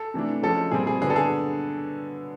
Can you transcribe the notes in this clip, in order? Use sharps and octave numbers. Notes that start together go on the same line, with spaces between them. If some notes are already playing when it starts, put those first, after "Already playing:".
Already playing: A4
C3 E3 A3 D4
F3 G#3 C#4 A4
A#2 G3 C4 G#4
G#4
D3 F#3 B3 D4 G#4
A4
G#4